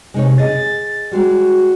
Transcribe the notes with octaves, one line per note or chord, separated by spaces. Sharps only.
C3 G#3 D#4 C#5
G#4 D#5 A6
G3 G#3 F#4 G#4